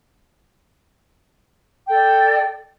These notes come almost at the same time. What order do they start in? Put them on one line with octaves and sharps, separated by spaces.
G5 A4 D5